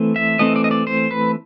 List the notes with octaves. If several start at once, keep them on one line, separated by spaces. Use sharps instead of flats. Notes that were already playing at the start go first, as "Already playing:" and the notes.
Already playing: E3 A3 C4
E5
E3 A3 C4 D#5
D5
D#5
D5
C5
B4